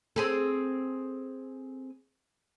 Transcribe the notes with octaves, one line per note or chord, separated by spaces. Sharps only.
C4 G#4 A4